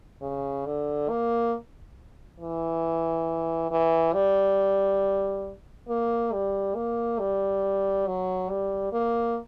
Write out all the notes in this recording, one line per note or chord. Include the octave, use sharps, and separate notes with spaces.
C#3
D3
A#3
E3
E3
G3
A#3
G3
A#3
G3
F#3
G3
A#3